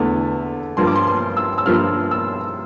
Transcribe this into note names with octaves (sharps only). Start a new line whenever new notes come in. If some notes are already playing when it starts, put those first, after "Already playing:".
Already playing: E2 D3 A3
G2 F3 A#3 F4 C6
D6
C6
C6
E6
E6
G2 F3 A#3 F4 F6
E6